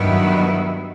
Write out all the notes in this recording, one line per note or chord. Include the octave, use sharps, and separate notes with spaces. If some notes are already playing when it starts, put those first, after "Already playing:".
Already playing: G2 D#3 F#3 B3 E4